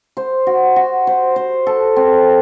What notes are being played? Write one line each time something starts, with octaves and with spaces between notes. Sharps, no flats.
C5
F#4
F#4
C5
C5
A4
C4